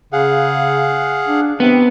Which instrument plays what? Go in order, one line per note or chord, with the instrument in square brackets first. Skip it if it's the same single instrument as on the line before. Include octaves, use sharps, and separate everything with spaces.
[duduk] C#3 [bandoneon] G#4 F5 F#5
[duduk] D4
[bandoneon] C3 D#3 [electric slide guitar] B3 [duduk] C4